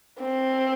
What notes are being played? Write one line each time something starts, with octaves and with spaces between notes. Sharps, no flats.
C4